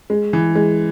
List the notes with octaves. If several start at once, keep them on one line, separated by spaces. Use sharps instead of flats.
G#3
E3
G#3